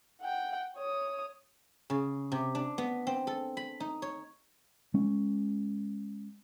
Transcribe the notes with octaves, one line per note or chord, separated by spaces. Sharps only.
F#5 G5
C#5 D#6
C#3
C3
D4
B3
C4
A4
B5
D#4
C#5
G#3 C#4